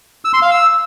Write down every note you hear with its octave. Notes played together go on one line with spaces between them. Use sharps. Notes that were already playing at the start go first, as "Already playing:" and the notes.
E6
C6
F5
E6